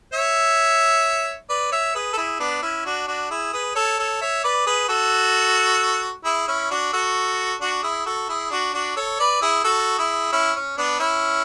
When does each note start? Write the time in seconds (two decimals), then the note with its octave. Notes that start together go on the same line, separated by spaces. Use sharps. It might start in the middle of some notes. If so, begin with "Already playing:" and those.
0.13 C#5 E5
1.49 B4 D5
1.72 C#5 E5
1.95 G#4 B4
2.13 A4
2.17 E4 G#4
2.40 B3 D4
2.62 C#4 E4
2.85 D4 F#4
3.08 D4 F#4
3.30 E4 G#4
3.53 G#4 B4
3.75 A4 C#5
3.99 A4 C#5
4.22 C#5 E5
4.44 B4 D5
4.66 G#4 B4
4.89 F#4 A4
6.25 E4 G#4
6.48 C#4 E4
6.71 D4 F#4
6.93 F#4 A4
7.61 D4 F#4
7.83 E4 G#4
8.06 F#4 A4
8.29 E4 G#4
8.51 D4 F#4
8.74 D4 F#4
8.96 A4 C#5
9.19 B4 D5
9.42 E4 G#4
9.64 F#4 A4
9.98 E4 G#4
10.32 C#4 E4
10.56 C#4
10.78 B3 D4
11.00 C#4 E4